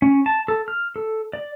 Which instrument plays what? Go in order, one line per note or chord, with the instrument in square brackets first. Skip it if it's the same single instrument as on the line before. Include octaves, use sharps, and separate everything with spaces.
[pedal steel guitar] C#4
A5
A4
F6
A4
D5